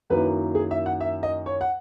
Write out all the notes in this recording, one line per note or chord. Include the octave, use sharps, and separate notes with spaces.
F#2 D#3 F#3 A#3 E4 B4
G#4
E5
F#5
E5
D#5
C#5
F#5